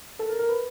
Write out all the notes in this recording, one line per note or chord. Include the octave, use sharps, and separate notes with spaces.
A4
A#4
A#4
B4